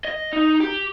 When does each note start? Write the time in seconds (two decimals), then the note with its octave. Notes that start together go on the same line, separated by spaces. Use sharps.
0.05 D#5
0.33 D#4
0.60 G4